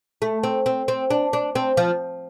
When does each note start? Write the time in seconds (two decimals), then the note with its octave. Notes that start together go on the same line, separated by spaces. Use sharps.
0.22 A3
0.43 C4
0.66 C4
0.88 C4
1.10 D4
1.33 D4
1.55 C4
1.77 F3